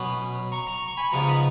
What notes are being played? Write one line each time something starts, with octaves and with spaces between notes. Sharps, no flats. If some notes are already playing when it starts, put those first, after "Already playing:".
Already playing: B2 F#3 C#4 B5 D#6
A#5 C#6
A#5 C#6
C#6
G#5 B5
C#2 C#3 F3 B3 D#4 A#5 C#6
B5 D#6